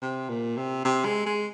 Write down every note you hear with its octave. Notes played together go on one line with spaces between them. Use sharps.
C3
A#2
C3
C3
G#3
G#3